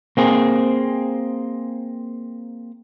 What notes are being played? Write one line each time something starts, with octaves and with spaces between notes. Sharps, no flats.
A#3 C4 G#4